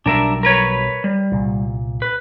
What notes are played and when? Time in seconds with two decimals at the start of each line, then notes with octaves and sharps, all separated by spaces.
0.06 B1 F#3 G3 D4 A#4 E5
0.43 A#4 B4 C#5
1.04 G3
1.32 C2 A#2
2.02 B4